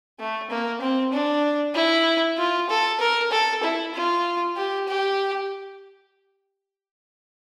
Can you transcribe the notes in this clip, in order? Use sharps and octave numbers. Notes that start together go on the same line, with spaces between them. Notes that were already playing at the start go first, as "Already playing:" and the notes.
A3
A#3
C4
D4
E4
F4
A4
A#4
A4
E4
F4
G4
G4